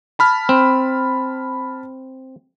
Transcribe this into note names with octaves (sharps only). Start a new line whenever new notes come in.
A5 B5 F6
C4